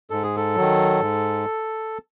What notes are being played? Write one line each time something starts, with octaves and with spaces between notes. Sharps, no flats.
G#2 A4
G#4
A4
D#3 F#3
G#2